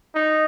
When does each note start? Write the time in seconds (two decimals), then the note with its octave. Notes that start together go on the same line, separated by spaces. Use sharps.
0.15 D#4